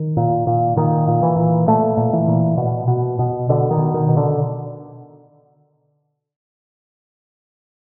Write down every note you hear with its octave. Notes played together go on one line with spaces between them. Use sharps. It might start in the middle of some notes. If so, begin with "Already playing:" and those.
Already playing: D#3
A#2
A#2
A#2 D#3
A#2
E3
A#2
A#2 A3
A#2
E3
A#2
B2
B2
B2
B2 D3
D#3
B2
D#3
B2
D3